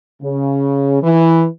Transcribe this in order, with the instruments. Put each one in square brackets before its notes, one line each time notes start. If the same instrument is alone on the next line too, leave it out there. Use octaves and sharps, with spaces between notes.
[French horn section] C#3
E3